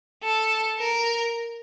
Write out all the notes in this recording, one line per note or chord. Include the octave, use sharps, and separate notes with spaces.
A4
A#4